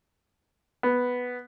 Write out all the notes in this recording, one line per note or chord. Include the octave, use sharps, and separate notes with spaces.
B3